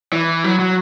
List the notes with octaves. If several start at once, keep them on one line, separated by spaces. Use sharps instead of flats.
E3
F#3
F#3